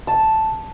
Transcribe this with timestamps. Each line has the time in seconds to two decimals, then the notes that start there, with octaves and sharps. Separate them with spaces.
0.07 A5